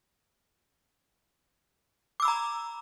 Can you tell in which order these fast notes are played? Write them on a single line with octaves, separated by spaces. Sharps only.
D6 E6 B5 A#5